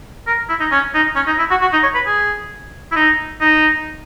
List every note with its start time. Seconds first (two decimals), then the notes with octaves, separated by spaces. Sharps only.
0.27 A#4
0.49 E4
0.60 D#4
0.71 C#4
0.94 D#4
1.16 C#4
1.27 D#4
1.38 E4
1.50 F#4
1.62 F#4
1.73 D#4
1.83 C#5
1.95 B4
2.06 G#4
2.92 E4
2.96 D#4
3.41 D#4